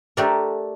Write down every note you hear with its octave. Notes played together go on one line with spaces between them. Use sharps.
A3 D4 G4 A#4 D5